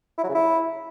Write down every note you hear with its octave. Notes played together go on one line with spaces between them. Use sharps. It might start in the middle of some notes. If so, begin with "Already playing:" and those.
E4
F#3
C#3
E4